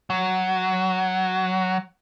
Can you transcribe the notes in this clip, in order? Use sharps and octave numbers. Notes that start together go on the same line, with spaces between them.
F#3